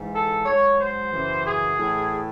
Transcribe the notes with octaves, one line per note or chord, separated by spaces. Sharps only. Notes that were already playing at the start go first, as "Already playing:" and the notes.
Already playing: G#2 E3
A4
G#2 F#3 C#5
C5
F#2 C#3 E3
G#4
A2 E3